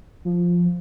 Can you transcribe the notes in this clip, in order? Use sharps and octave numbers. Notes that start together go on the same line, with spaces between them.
F3